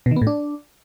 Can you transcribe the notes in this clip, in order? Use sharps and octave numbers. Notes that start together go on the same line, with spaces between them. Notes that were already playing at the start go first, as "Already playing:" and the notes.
B2
D#3
B3
A2
D4